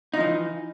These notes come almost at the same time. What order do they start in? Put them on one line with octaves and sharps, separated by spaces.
D#4 F3 E3